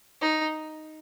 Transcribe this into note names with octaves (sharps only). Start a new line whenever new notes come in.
D#4